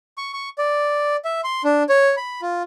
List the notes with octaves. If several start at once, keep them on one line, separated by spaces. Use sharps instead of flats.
C#6
C#6
D5
E5
C6
D4
C#5
B5
F4